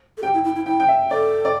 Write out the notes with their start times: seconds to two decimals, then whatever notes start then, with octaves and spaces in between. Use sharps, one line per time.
0.17 A4
0.23 G4 G5
0.34 E4
0.44 E4
0.56 E4
0.66 E4 G5
0.80 G5
0.88 E5
1.10 A4 D5
1.45 D5